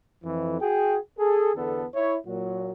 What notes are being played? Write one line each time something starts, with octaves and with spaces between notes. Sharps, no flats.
F2 E3
F#4 G#4 G5
G#4 A4
E2 D3 B3 A4
E4 C#5
A#2 F#3 F#4